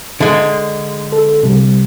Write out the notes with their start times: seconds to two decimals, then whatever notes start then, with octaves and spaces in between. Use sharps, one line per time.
0.20 D3 G#3
1.12 A4
1.43 C3 G3